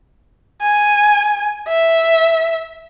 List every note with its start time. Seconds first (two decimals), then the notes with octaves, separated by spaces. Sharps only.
0.62 G#5
1.68 E5